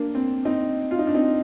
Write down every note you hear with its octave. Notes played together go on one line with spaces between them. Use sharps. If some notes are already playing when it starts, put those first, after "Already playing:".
Already playing: A#3 D4
C4
C4 D#4
F4
D#4
D4
C4 D#4